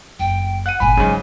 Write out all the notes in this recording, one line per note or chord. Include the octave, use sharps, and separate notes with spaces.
F#1 G5
F#5 F#6 D#7
G1 A#2 G#5 B5
G#2 C#3 F#3